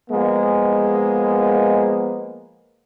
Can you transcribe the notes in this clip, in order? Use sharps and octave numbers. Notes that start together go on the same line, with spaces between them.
F3 G#3 A#3 B3